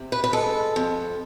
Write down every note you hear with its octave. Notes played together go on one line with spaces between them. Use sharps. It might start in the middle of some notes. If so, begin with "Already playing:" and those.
Already playing: C3
B4
B4
G#3 A4
F2